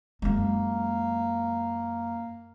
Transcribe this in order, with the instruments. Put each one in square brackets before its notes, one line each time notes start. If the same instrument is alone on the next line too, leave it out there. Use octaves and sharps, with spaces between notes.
[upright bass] F#2 G#3 [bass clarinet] A#3